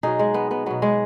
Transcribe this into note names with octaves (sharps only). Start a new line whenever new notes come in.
B2 F#3 D#4 G#4
G#3
B3
B3
B2 F#3 B3
G#3